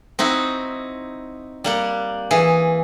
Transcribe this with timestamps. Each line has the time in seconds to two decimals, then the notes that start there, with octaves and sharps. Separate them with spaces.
0.19 C4 D#4 E4 F#4
1.64 G3 A#3 F#5
2.31 E3 G#4